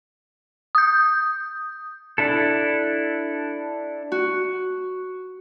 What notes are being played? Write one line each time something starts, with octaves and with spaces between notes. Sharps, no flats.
D#6 G6
D4 E4 A4
F#4